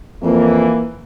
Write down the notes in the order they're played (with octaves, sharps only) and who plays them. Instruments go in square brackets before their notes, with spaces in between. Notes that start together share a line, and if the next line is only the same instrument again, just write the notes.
[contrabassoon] F2 [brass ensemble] E3 A#3